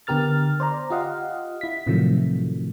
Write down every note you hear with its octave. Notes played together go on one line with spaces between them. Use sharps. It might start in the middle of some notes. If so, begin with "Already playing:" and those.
D3 B3 G4 A#4 F6 A6
C5 D5 A#5
F4 G4 D#5 F5 F#5
E4 B6
A2 C3 D#3 F3 F#3 A3